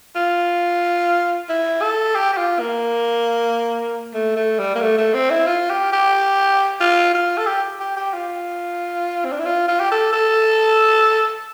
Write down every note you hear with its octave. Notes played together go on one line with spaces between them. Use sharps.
F4
E4
A4
G4
G4
F4
A#3
A3
A3
G3
A#3
A3
A3
C4
E4
F4
G4
G4
F4
F4
A4
G4
G4
G4
F4
C4
D4
E4
F4
F4
G4
A4
A4